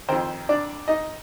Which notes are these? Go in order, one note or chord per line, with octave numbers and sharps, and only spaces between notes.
F2 D#3 C4 C5
D4 D5
D#4 D#5